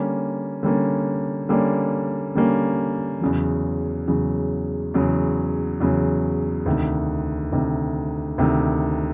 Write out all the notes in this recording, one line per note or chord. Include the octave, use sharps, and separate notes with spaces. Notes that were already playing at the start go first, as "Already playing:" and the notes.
Already playing: D3 G3 A#3 C#4
D3 G3 A#3 C#4
D3 G3 A#3 C#4
D3 G3 A#3 C#4
E2 C#3 F#3
E2 C#3 F#3
E2 C#3 F#3
E2 C#3 F#3
D2 C3 D#3
D2 C3 D#3
D2 C3 D#3